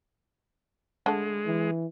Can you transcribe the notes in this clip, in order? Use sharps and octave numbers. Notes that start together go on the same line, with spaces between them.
D3 G#3 A3
E3